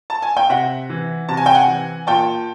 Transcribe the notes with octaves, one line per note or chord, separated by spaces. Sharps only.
A5
G#5
G5
C3 E5 F#5
E3
C3 A5
G#5
G5
F#5 G#5
E3
A#2 G5 A5